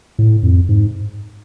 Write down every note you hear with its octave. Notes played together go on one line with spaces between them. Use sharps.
A2
F2
G#2